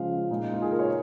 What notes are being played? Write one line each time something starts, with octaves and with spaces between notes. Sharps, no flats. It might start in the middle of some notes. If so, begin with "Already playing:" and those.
Already playing: C#3 F3 G#3 F5
A#2 G#3 D#4
F4
G#4
A#4
C#5